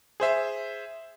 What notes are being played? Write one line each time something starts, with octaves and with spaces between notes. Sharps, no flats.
G#4 C5 E5